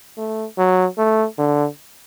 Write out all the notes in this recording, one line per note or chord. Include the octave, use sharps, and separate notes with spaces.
A3
F#3
A3
D3